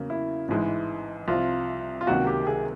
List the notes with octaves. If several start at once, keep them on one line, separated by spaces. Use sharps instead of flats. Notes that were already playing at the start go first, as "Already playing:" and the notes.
Already playing: E2 C#3 F#3 A#3 C#4
E4
A1 G#2 E3 G#3 E4
C2 C3 F3 F4
F4
C#2 C3 D#3 F#3 A#3 F#4
G4
G#4